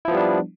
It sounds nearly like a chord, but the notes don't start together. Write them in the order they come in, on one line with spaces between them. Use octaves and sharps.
E4 F3 B3 G3 D4